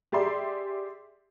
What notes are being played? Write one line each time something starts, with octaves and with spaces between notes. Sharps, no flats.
G4 G#4 D5 E5 C6